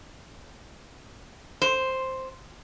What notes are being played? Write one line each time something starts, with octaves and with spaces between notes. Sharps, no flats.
C5